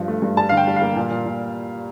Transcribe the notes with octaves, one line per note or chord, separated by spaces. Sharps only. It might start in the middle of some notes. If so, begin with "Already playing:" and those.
Already playing: G2 F3
A3
G2
G3 A5
D3 F5
G5
G3
F5
A#3
A#2
A#2
A#2